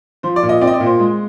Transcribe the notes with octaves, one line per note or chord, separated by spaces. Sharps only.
F3 C5
D5
A#2
D#5
C4 D5
D#5
D5
A#2
C5
G#3